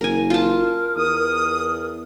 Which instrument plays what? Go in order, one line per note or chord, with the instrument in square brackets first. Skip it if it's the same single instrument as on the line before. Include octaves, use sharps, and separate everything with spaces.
[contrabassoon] F#1 [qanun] A#4 G#5
[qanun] F4 A5 [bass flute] A#4
[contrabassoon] E2 [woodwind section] D#6